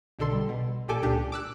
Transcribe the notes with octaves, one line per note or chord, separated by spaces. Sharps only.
B1 B2 D3 A4 C6
G3
B2
A1 A#2 G4 A4 G#5 D6
C#2 A#2 D4 G4
D6 E6 F#6